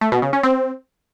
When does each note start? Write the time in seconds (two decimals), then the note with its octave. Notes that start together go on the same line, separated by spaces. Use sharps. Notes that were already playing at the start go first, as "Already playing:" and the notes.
0.01 A3
0.12 B2
0.22 C#3
0.33 C#4
0.43 C4